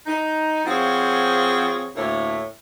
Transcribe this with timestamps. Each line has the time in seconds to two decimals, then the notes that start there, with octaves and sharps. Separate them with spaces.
0.06 D#4
0.65 F3 C4 G#4 C#5 F5 F#5
1.96 D2 A2 A#3 E4 C#5